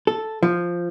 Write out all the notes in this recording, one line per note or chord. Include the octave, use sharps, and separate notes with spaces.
A4
F3